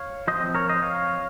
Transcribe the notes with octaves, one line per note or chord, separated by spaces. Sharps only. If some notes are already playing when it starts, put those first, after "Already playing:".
Already playing: C#5 F5
F3 C4 C5 D#5
A#4 C#5
C5 D#5
C#5 F5